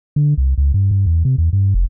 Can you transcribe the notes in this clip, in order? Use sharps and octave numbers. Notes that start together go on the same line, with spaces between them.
D3
C2
C#2
G2
G2
E2
C3
E2
G2
F1